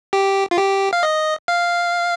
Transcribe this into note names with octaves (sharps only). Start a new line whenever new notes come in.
G4
F4
G4
F5
D#5
F5